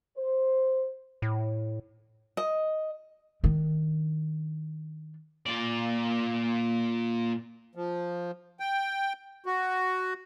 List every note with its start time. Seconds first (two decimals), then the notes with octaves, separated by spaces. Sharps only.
0.18 C5
1.22 A2
2.37 D#5
3.44 D#3 D4
5.46 A#2 D5
7.75 F3
8.60 G5
9.46 F#4